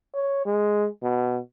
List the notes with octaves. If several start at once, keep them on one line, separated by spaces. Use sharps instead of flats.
C#5
G#3
B2